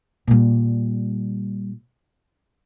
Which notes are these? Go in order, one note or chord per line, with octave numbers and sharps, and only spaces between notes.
A#2 G3